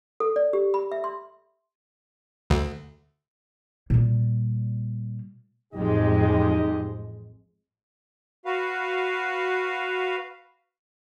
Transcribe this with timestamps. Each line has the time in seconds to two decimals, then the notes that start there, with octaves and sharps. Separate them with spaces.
0.20 A4
0.36 D5
0.53 G4
0.74 B5
0.92 E5
1.04 C6
2.50 D2
3.90 A#2 G3
5.74 A1 F2 G#3 D#4 G4 D#5
8.45 F#4 B4 F5